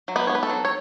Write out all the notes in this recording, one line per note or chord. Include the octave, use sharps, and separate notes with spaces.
F#3
B3 B4
B3 C#5
B4
A4
F#3
C#5